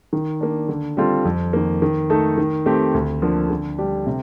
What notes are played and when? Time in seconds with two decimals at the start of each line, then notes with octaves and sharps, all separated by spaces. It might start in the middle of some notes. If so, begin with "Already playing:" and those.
0.13 D#3
0.41 A#3 D4
0.69 D3
0.97 G3 C4 F4 A4
1.25 F2
1.53 D#3 A#3
1.82 D#3
2.10 A3 D#4 A4
2.37 D#3
2.66 A3 C4 G4
2.94 D2
3.22 D3 F3 A#3
3.50 D3
3.78 G3 D4 G4
4.07 C3